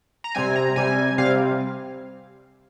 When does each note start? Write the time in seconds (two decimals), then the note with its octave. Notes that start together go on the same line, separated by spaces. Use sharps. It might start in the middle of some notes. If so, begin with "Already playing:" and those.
0.24 A#5
0.35 C3 G3 C4 G#5
0.56 A#5
0.76 C3 G3 C4 G#5
1.18 C3 G3 C4 F5